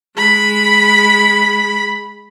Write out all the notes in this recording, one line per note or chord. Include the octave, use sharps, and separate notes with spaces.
G#3 B5